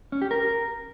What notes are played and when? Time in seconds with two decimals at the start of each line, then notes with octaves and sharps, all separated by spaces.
0.12 C#4
0.22 G4
0.31 A#4